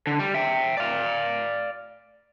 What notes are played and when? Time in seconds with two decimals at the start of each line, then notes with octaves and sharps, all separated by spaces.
0.07 D3
0.20 G3
0.34 E5 G5
0.77 D5 F5